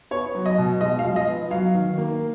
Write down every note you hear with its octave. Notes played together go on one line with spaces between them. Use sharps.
B3 C#5
F#3
D#5
B2
G#3 D#5
F5
F3
D#5
B3
F#3 F5
D#3
A#3